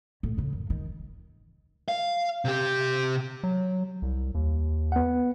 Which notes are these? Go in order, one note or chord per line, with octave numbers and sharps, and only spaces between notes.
A2
A2 C#3
F#2
D#3
F5
C3 G4
F#3
C2
D#2
B3 F#5